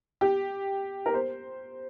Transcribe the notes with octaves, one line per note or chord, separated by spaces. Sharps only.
G4
A#4
C5